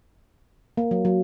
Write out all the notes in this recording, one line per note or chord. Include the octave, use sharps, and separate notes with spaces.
A#3
F#3
F#3